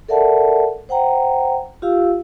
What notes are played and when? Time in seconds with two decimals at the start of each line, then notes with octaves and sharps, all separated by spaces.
0.09 A4 A#4 D5 E5 F#5 A5
0.89 C5 F#5 G5 A#5
1.82 F4 G4 F5 E6